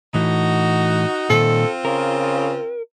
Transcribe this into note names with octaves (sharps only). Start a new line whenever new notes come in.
A2 E3 D#4 F#4
A#2 D#3 C4 F4 A4
C#3 A#4